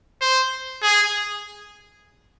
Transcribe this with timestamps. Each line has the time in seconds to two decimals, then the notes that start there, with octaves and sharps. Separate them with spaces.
0.21 C5
0.83 G#4